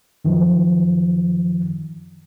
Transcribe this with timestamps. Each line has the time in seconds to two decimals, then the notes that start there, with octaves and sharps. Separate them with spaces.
0.25 F#2 D#3 F3